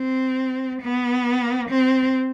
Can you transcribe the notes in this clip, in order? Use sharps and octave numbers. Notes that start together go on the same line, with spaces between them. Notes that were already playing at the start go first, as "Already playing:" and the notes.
Already playing: C4
B3
C4